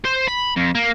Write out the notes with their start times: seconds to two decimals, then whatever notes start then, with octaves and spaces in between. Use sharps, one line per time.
0.05 C5
0.28 B5
0.56 F2
0.75 A#3